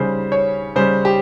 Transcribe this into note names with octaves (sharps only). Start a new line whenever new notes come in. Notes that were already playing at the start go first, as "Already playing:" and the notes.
Already playing: C#3 G3 C5
C#5
C#3 G3 C5
G4